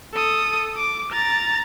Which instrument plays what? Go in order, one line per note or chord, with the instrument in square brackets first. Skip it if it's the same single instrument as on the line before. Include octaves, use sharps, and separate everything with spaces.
[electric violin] A4 D#6
D6
A#5 A6